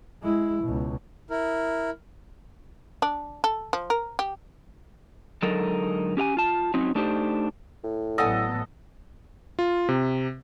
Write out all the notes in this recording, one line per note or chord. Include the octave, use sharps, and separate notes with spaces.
G#3 E4
C#2 B2
E4 A#4
D4
A4
F3
A#4
G4
D3 F#3 G#3 D#4 A4 A#4
C#4 G4 F5 G#5
F4 A5
F#3 C4 C#4 D#4
A3 D4 D#4 G4 C5
A2
A1 F#3 B3 A4 D5 D#5 F#5 G#5
F4
C3